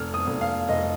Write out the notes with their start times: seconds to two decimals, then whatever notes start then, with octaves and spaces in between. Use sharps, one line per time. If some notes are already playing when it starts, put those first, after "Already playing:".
Already playing: F1 F6
0.14 D#6
0.27 F1
0.41 F5
0.69 F1 D#5